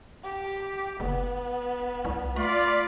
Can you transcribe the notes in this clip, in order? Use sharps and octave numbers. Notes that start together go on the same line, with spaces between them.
G4
F#1 B3
C2
A3 F4 D5 B5